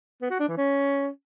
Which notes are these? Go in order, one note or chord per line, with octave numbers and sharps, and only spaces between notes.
B3
F#4
D4
E3
C#4